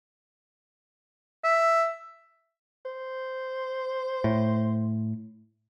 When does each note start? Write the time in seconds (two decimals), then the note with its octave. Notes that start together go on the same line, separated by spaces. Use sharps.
1.44 E5
2.85 C5
4.24 A2